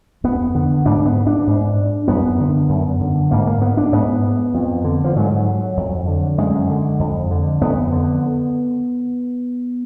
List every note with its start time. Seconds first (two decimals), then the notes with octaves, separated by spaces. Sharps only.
0.24 F2 B3
0.54 D3
0.86 G#2 D4
1.06 B3
1.27 D4
1.47 G#2
2.08 F#2 B3
2.40 D3
2.69 F#2
3.01 D3
3.31 G#2 A#3
3.47 A#3
3.62 B3
3.77 D4
3.92 G#2 B3
4.54 F2
4.84 D3
5.04 F3
5.16 G#2 F#3
5.77 F2
6.08 D3
6.38 F#2 G#3
6.70 D3
6.99 F2
7.31 D3
7.61 F2 B3
7.92 D3